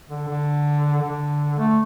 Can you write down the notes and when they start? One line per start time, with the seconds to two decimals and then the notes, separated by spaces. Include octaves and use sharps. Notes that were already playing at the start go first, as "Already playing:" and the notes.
0.09 D3
0.28 D3
1.02 D3
1.58 A3